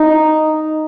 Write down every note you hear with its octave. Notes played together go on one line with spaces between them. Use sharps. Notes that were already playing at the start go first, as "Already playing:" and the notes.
Already playing: D#4